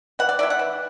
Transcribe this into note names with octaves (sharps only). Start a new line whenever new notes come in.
E3 F#5
D5
A3 E4 D5
F#5
E3